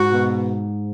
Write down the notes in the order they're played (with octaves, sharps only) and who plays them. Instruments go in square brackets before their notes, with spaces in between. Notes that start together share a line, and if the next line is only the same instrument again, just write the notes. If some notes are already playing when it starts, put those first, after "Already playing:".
Already playing: [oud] G#2 [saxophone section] F#4
[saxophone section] B2